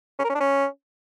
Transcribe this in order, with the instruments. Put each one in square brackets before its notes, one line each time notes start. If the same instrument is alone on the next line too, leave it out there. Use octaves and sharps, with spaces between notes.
[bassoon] C#4
A#4
C#4
D4
C#4